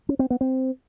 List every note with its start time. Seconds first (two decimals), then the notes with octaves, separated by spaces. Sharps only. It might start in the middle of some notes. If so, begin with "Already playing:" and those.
0.09 C#4
0.19 C4
0.30 B3
0.41 C4